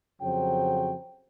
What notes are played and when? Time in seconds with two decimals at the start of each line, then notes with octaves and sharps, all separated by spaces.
0.22 F2 C#3 F#3 C5 G5